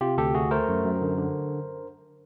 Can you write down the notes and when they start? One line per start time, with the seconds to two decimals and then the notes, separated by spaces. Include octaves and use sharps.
0.01 C3 F4 G4
0.18 D2 G4 A4
0.34 A3 F#4 G#4
0.51 A3 A#4 C5
0.68 F#2
0.85 F#2
1.01 D3
1.18 D3